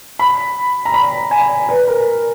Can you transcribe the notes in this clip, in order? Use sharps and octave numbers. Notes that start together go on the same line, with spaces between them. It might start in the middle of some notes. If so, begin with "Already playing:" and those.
B5
A#5
B5
G#5
B4
A#4